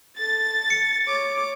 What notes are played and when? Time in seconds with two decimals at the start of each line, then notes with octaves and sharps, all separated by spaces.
0.18 A4 A6
0.70 C#7
1.08 C#5 D6